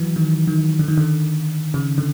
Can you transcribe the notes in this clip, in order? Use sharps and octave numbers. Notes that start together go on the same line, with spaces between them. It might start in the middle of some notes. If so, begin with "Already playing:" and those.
Already playing: E3 F#3
D#3
D#3
D3
D#3
D3
C#3
D3